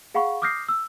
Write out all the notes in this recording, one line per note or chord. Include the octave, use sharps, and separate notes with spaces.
G#4 F5 F#5 B5 C#6
D6 D#6 F6 G6 A#6 C7
E6